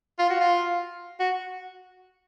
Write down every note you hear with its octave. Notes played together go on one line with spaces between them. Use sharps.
F4
F#4
F4
F#4